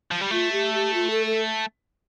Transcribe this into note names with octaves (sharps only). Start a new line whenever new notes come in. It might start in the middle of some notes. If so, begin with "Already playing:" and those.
F3
G3
A3 F4
G4
G4
F4
A4
A4